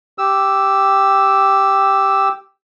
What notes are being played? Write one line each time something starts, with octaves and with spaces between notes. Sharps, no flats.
G4 E6